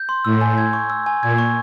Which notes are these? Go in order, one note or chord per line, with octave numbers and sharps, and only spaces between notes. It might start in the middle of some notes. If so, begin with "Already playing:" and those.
Already playing: G6
C6
A2 E6
G#5
G#6
C#6
E6
G#5
A#2 G#6
C#6